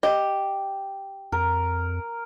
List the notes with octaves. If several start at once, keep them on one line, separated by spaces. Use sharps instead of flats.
G4 D#5
F2 A#4